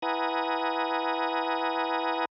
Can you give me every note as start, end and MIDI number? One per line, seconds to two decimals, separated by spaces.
0.02 2.25 64
0.02 2.25 71
0.02 2.25 78
0.02 2.25 80
0.02 2.25 82
0.02 2.25 87